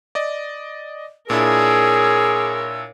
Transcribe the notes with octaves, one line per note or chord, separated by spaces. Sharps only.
D5 D#5
A#2 D4 E4 G#4 A#4 C#5 E6